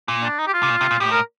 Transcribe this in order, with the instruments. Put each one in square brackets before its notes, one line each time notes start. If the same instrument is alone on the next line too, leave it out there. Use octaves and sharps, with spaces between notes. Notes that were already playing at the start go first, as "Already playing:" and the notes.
[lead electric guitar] A#2
[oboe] D4
D#4
G4
F4
[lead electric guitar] C3
A#2
C3
A#2
[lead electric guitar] A2 [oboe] G4
[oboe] A#4